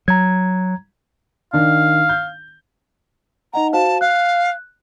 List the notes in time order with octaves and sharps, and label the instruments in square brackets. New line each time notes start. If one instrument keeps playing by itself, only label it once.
[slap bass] F#3 [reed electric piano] A#5 G#6
[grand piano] D#3 D4 [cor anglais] F5
[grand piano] G6
[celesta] D#4 D#5 F#5 [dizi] A#5
[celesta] F#4 C5 F5 [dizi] A5
[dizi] F5 [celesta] F#6